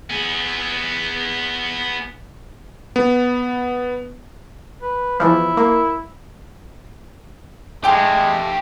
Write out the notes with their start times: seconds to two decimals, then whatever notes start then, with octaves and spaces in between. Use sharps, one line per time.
0.10 B3 G#4
2.96 B3
4.82 B4
5.20 E2 E3 F3 E4
5.57 A#3
7.84 G#3 A3 G4 F5 G5